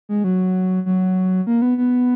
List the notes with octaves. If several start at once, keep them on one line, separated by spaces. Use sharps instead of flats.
G#3
F#3
F#3
A#3
B3
B3